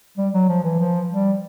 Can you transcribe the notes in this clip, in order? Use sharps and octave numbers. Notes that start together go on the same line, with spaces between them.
G3
F#3
F3
E3
F3
G3